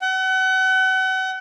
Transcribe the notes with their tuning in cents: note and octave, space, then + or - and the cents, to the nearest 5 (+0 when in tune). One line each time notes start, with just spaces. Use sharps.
F#5 +35